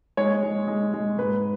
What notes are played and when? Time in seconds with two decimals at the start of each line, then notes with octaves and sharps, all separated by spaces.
0.17 G#3 C#5
0.43 G#3
0.68 G#3
0.94 G#3
1.18 G#2 B4